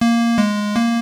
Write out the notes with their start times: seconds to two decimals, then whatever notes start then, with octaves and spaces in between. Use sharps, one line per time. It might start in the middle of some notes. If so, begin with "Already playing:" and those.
0.01 A#3
0.38 G#3
0.76 A#3